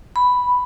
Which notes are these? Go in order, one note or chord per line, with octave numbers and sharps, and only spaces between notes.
B5